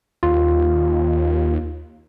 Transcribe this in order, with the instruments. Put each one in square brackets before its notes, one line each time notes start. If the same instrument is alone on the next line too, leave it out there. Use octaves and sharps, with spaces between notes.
[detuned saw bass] D#2 [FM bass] F4